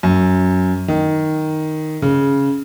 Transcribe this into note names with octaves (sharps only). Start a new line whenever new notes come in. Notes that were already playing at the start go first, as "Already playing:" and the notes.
F#2
D#3
C#3